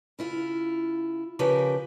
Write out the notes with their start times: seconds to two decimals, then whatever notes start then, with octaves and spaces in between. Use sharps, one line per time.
0.19 C#3 E4 F4
1.39 C#3 F3 G4 A#4 B4 G#5